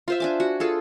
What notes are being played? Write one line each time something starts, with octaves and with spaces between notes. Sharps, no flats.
F4 C5 E5
D4 G#5 D6
F#4
F4 G#4 A4